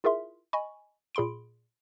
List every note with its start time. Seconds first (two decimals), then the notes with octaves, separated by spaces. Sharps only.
0.04 E4 F4 G#4 A#4 E5 C6
0.53 D#5 G#5 B5 C#6
1.15 A#2 G#4 B5 C6 D7